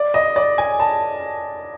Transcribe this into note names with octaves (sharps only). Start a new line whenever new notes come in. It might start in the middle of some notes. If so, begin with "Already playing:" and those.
Already playing: D5
D#5
D5
G#5
A5